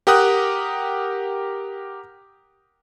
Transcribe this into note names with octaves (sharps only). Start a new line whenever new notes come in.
G4 A#4 F#5 G5 D#6 F#6